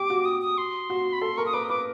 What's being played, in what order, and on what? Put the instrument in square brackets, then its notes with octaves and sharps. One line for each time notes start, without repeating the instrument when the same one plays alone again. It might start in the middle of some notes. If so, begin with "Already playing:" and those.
Already playing: [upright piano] G4 [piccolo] D6
[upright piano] F#4
[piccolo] D#6
D#6
C6
[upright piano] F#4
[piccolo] B5
[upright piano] A4 [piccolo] C6
[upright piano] A#4 [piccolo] C#6
[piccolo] D#6
[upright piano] B4 [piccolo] D6
[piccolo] D#6
[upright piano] B4 [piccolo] D6